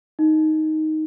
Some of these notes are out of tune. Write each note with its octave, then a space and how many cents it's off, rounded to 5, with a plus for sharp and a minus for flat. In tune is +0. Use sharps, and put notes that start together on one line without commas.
D#4 +5